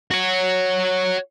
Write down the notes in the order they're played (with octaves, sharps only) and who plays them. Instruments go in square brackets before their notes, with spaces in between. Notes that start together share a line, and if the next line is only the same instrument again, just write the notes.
[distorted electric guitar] F#4 C#5